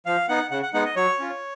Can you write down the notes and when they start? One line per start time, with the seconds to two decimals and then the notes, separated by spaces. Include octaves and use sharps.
0.06 F3 F5
0.29 B3 D#4 F#5
0.51 C#3 F#5
0.63 F#5
0.73 G#3 B3 D#4 F#5
0.85 D#5
0.96 F#3 C#5
1.19 C#4 F4